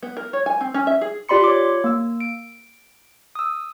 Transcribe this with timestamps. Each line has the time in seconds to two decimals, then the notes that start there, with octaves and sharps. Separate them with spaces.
0.03 B3
0.17 A#4
0.33 C#5
0.46 G#5
0.61 C4
0.74 C#4
0.87 E5
1.01 G#4
1.29 F4 G4 D5 B5 C6 C#7
1.44 C#5 D6
1.84 A#3 E6
2.20 D7
3.35 D#6 E6